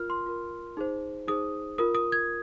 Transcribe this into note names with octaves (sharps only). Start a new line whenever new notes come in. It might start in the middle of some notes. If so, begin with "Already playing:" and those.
Already playing: F4 A#4 F6
C6
F4 A#4
D#4 G#4 C5
D#4 G#4 C5 D#6
F4 A#4 D#6
D#6
G#6